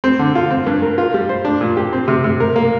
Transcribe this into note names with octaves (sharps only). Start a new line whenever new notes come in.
C4
D3
F4
C4
G2
A#4
F4
G3
C5
D4
A#2
G4
C4
C3
C3
A#4
A#3